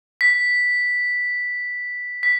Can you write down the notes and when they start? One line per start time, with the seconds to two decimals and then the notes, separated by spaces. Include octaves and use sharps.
0.21 B6
2.23 B6